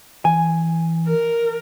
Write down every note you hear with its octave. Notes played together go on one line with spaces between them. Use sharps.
E3 G#5
A#4